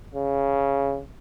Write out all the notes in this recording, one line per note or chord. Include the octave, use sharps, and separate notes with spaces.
C#3